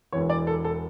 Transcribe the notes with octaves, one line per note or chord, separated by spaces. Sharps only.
E1 E2 E3 C#5
D5
A4
A4